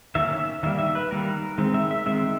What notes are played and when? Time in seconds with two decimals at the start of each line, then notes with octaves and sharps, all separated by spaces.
0.15 D#3 F#3 A#3 C#4 E5
0.63 D#3 G3 A#3 E5
0.79 E5
0.95 B4
1.11 D#3 G3 A#3 A#4
1.58 D#3 G#3 C4
1.74 E5
1.91 E5
2.06 D#3 G#3 C4 E5